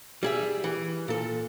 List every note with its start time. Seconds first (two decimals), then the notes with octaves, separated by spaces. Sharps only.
0.23 G3 G#4 E5
0.64 E3
1.08 A#2 A4